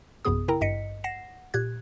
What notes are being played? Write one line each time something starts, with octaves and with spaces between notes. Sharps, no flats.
A#1 F#2 C3 B3 G#4 D#6
C#3 E4 A#4 G5 A#5
G#1 G2 D#5 B6 C#7
F#5 A#6 C7 E7
A#2 G4 F#6 G#6